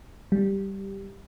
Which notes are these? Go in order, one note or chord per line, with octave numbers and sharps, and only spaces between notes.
G3